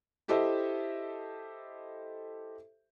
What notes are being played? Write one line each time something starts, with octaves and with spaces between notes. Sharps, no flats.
E4 G4 A4 C5 D#5 E5